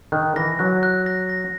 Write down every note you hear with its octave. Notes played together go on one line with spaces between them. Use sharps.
D#3 F#6
E3 A#6
F#3 F#6
F#6
A#6
A#6